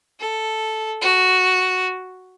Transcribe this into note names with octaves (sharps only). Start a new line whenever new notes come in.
A4
F#4